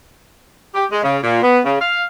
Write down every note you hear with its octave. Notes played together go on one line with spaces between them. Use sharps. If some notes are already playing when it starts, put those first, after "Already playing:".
G4
G#3
C#3
A#2
B3
C#3
F5